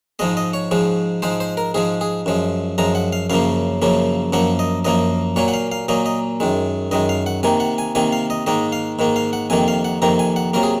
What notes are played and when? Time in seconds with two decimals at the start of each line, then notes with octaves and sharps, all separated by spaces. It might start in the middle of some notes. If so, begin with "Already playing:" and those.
0.19 G#2 F3 G#3 D#5
0.37 D#5
0.53 C#5
0.71 G#2 F3 G#3
1.22 G#2 F3 G#3 C5
1.40 C5
1.57 A#4
1.74 G#2 F3 G#3 G#4
2.01 G#4
2.26 F#2 F3 G#3
2.78 F#2 F3 G#3 A#5
2.95 F#5
3.13 F5
3.30 F#2 C#3 F3 A#3 F5
3.82 F#2 C#3 F3 A#3
4.33 F#2 F3 A#3 F#5
4.59 D#5
4.85 F#2 F3 A#3 D#5
5.36 A#2 F#3 A#3 C#5
5.48 F#5
5.54 F5
5.72 F5
5.88 A#2 F#3 A#3 D#5
6.06 D#5
6.40 F#2 D#3 G#3
6.91 F#2 D#3 G#3 D#5
7.09 F5
7.26 F#5
7.43 C3 D#3 A#3 G#5
7.60 F#5
7.78 G#5
7.95 C3 D#3 A#3 G#5
8.13 F5
8.30 D#5
8.46 G#2 D#3 A#3 D#5
8.72 F5
8.99 G#2 D#3 A#3
9.16 F5
9.33 F#5
9.50 F2 C3 D#3 A#3 G#5
9.68 F5
9.85 F#5
10.02 F2 C3 D#3 A#3 A#5
10.19 G#5
10.36 F#5
10.54 C3 F#3 A#3 A#4
10.63 G#4